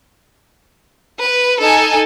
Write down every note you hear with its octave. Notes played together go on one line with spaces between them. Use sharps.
B4
D#4 A4 G#5